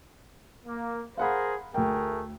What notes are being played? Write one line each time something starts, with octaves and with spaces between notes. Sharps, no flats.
A#3
G#4 A#4 C5 F5 F#5 B5
D2 A3 G#4 A#4 G5